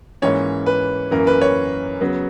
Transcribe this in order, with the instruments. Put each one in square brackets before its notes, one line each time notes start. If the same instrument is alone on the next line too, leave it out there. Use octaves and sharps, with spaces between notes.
[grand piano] G#2 E3 A#3 C#4 C#5
B4
F#2 E3 A#3 C#4 A#4
B4
C#5
C#3 F#3 B3